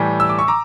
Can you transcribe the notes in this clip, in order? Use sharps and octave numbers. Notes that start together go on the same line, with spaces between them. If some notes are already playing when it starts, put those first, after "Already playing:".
Already playing: A2 E3 G3
E6
D6
C#6
A#5 D6